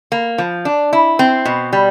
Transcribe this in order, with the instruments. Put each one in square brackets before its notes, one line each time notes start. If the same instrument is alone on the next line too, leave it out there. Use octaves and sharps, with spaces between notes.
[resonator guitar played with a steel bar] A#3
F3
D4
E4
C4
B2
G3